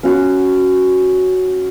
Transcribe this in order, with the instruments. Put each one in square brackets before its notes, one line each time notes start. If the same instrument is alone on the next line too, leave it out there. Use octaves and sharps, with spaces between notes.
[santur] C#4 F#4